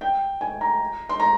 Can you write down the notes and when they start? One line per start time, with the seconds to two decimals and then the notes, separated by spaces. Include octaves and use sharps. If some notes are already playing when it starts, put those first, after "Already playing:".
0.01 G5
0.41 G#5
0.61 A#5
1.09 C6
1.20 A#5